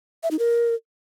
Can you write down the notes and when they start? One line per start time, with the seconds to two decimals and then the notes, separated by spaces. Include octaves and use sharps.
0.23 E5
0.31 D#4
0.39 A#4